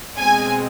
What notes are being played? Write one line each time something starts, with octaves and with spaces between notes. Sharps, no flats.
B2 G#3 C4 G#5